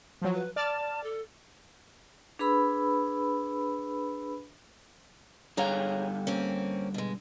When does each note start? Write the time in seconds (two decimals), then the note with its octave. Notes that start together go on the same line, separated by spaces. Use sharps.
0.22 F3 F#3
0.34 B4
0.56 D5 A5 F6 A6
1.04 A4
2.39 D4 G#4 B4 B5 E6
5.57 G2 D3 G#4 C#5 F5 A#5
6.27 A#3 C4 C#4
6.94 B2 G#3